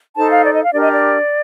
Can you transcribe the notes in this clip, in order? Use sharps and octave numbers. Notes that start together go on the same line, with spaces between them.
D#4 A4 C5 A5
F5
D5
D#5
F5
D4 G4 A#4 D5
D#5
D5